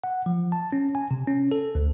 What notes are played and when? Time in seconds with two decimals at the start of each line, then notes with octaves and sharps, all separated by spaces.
0.04 F#5
0.26 F3
0.52 A5
0.73 C#4
0.95 G#5
1.11 C3
1.27 C#4
1.51 A4
1.75 D2